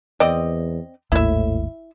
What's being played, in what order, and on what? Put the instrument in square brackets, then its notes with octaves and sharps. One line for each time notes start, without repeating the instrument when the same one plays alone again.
[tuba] E2 [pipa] C4 D5 D#5
[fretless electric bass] G#1 D#2 [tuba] A2 [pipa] E4 E5